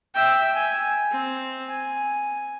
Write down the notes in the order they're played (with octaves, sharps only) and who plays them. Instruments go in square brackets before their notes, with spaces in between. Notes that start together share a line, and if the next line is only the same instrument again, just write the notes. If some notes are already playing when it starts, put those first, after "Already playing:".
[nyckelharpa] E5 G5
G#5
C4
G#5